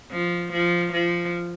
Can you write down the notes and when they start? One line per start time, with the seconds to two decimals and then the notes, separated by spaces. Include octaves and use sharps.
0.12 F3
0.53 F3
0.93 F3